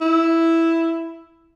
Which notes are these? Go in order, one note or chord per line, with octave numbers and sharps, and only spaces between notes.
E4